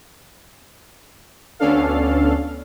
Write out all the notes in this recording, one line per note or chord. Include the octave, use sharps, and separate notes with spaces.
D2 B3 C#4 D4 A4 F5